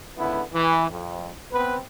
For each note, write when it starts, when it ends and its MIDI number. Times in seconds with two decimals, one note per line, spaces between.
0.17 0.42 37
0.17 0.42 50
0.17 0.42 59
0.17 0.42 64
0.53 0.87 52
0.88 1.31 41
1.52 1.76 59
1.52 1.76 60
1.52 1.76 71